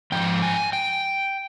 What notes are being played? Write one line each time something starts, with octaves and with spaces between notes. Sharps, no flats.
G#2 F3 G5
G#5
G5